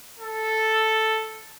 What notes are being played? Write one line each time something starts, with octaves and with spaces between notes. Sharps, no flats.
A4